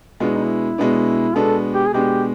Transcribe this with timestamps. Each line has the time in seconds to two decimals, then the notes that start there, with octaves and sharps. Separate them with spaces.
0.20 B2 G#3 B3 D4 F4
0.29 E4
0.35 D#4
0.44 E4
0.78 B2 G#3 B3 D4
1.35 B2 G#3 B3 D4 A4
1.74 G4
1.87 G#4
1.93 B2 G#3 B3 D4 G4